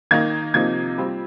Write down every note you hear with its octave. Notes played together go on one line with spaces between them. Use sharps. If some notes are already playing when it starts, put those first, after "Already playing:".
D#3 A#3 D#4 G#6
C3 F3 A#3 D#4 G#6
G3 C4 F4